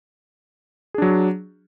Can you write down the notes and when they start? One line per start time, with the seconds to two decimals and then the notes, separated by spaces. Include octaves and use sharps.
0.94 G#4
0.98 D4
1.02 F#3